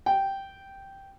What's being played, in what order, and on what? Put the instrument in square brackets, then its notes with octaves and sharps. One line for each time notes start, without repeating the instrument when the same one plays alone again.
[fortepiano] G5